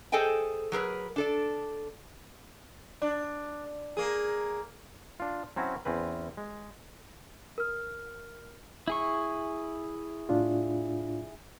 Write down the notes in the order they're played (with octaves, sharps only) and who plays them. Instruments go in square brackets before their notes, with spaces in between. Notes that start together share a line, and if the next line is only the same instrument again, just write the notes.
[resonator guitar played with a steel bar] G#4 A4 C5 D#5 G5 G#5
F#3 G#4 A#4 B4
D4 A4 D5
[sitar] D4
A#3 G#4
[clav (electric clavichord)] D4 F4
F#3 C4 C#4 E4 F#4
E2 C4 C#4 B4
G#3
[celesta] A#4 F6
[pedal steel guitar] E4 G#4 C#6
[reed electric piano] A2 D4 F4